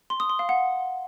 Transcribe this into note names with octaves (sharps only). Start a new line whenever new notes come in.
C6
D#6
C6
F5
F#5